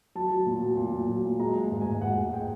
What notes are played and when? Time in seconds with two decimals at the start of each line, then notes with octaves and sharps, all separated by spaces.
0.15 F#3 A5
0.30 F#3
0.46 A#2
0.61 F#3
0.77 A#2
0.93 A#2
1.09 F#3
1.25 A#2
1.39 G#3 A#5
1.55 G#3
1.72 G#2
1.81 G#5
1.86 G#2
2.01 G#2 F#5
2.18 G#2
2.33 G#3 G5